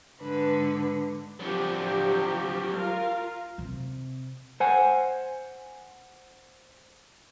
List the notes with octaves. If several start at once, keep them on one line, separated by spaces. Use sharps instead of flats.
G#2 D3 B4
F3 F#3 D4 G4
F4 A#4 F5
C3
C5 F#5 G#5